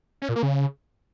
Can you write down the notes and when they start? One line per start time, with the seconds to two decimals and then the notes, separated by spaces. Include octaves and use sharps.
0.22 C#4
0.29 A#2
0.36 A#3
0.43 C#3